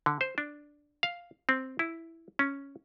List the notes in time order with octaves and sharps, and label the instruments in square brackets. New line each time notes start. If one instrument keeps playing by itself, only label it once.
[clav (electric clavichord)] D3
C5
D4
F5
C4
E4
C#4